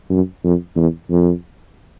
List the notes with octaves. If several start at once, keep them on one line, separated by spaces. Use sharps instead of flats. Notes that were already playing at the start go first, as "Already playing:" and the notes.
F#2
F2
E2
F2